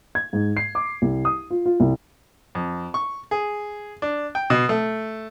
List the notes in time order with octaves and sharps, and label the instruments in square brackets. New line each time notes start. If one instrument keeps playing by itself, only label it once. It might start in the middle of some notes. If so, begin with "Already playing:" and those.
[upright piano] G#6
G#2
C7
D6
C2
D#6
F4
F4
C2
[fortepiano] F2
C#6
G#4
D4
G5
B2
A3